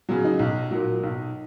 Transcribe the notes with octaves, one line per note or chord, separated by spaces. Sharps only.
C#3 F#3
D#4
B1
A#2 F#3
B1